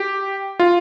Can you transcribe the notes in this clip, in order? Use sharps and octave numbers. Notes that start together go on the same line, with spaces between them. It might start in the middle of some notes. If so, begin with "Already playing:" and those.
Already playing: G4
F4